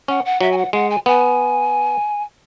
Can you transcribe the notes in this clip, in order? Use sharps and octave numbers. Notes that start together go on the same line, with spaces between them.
C#4 F#5
F#5
F#3 E5
G#5
F#5
G#3 F#5
G#5
B3 G#5